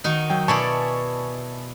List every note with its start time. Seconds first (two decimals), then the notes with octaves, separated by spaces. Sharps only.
0.04 D#3 D#4 F#4
0.30 F#3 G5
0.48 B2 E4 D5 G#5 A5 C#6